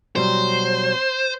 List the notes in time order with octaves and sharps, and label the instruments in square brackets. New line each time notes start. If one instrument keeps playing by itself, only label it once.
[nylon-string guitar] B2 F#3 G3 [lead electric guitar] C5